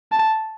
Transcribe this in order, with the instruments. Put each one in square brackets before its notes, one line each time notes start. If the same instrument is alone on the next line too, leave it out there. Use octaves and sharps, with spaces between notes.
[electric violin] A5